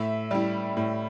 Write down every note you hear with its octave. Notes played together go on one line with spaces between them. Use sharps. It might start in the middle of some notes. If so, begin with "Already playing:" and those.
Already playing: A2 E5
G3 E4
A2